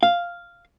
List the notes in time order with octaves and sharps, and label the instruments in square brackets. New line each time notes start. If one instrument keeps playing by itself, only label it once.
[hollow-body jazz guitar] F5